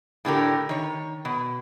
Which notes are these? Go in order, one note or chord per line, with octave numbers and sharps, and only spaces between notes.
A2 D3 G4 A#4
D#3 C#5
B2